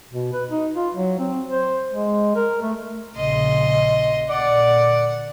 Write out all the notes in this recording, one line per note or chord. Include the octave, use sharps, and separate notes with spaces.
B2
B4
D#4
F4
F#3
C4
C5
G#3
A#4
A3
A#1 C#3 D#5 C6
A#2 D3 D5 F#5